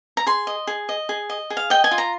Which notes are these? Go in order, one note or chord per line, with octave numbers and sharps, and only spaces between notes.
A#5
G#4 C6
D#5
G#4
D#5
G#4
D#5
G#4
F5
D#5 G5
G#5
F4
A#5